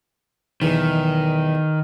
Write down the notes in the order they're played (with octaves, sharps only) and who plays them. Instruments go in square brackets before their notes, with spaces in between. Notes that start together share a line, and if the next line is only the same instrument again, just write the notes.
[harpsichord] B1 E2 E3 [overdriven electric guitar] D#3